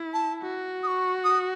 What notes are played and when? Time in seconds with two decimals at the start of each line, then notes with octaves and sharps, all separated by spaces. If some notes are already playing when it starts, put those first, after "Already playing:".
Already playing: E4
0.14 A5
0.42 F#4
0.83 D#6
0.87 C#6
1.24 D#6